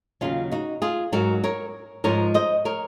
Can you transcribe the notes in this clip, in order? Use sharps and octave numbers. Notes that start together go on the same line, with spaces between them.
D#2 C#3 F#3 C#4 F4
D#4 F#4
F4 G#4
G#2 F#3 F#4 A#4
A#4 C#5
G#2 F3 G#3 A#4 C#5
C5 D#5
A#4 C#5